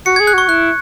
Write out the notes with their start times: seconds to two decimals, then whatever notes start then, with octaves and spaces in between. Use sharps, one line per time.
0.06 F#4 C#7
0.16 G#4 G#6
0.27 F#6
0.34 F#4 C#6
0.48 E4 F#6